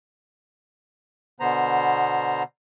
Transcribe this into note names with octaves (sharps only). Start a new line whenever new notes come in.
B2 D3 B3 C5 A#5